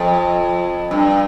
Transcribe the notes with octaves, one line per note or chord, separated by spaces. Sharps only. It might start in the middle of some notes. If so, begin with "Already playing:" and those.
Already playing: F2
G2